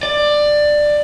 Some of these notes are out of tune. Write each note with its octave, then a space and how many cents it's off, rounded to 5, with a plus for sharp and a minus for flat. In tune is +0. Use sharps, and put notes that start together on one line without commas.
D5 +15